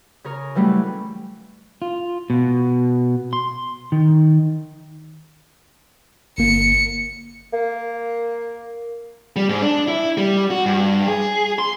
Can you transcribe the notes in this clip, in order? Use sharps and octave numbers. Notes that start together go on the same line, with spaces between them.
C#3 G#4 A#4 C#5
E3 F#3 G3 A3 C#4 E4
F4
B2
C6
D#3
G1 A#3 C#7
A#3
G3
G#2
D4
E4
G3
F#4
G2
G#4
C6